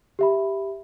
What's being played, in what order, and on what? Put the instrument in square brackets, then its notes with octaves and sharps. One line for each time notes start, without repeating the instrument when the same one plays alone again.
[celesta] G4 E5 B5